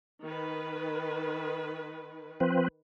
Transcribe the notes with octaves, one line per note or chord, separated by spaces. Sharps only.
D#3 B4
F3 C4 B4